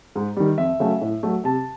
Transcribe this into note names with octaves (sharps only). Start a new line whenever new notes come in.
G#2
D#3 G3
F2 E5
C#3 F#3 A3
A2
F#3 A3
C3 A5